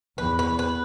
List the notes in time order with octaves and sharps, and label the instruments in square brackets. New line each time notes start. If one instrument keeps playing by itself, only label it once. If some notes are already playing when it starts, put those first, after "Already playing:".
[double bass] E2 [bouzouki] B4
[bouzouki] B4
B4